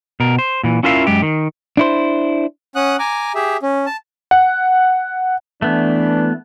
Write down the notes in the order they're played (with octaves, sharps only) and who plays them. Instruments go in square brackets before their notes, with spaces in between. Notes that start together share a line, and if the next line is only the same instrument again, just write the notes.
[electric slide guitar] B2 A#4
C5
A#2 E3
C#4 E4 F4 A#4 E5 F5
F#2 G#3 G4
D#3
[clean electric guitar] D4 E4 C5
[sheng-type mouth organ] C#4 F#5 D#6 F#6
G#5 A#5 D6
G4 G#4 E5
C#4
A5
[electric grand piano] F#5
[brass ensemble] E3 D4 [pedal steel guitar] A3 B3